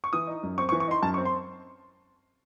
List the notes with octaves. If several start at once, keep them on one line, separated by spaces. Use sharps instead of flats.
C#6
E3 D#6
D#4
F#2
C4 C#6
C#6
E3
C#6
D#4 C6
F#2 A5
C#6
C4
C6